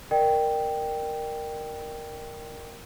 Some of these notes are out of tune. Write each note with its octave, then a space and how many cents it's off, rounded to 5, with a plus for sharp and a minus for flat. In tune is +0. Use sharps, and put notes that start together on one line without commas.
A#4 +0 D5 +45 G5 +0